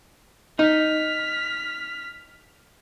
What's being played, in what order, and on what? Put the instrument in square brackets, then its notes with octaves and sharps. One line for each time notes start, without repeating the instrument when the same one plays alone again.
[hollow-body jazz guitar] D#4 [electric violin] F6 B6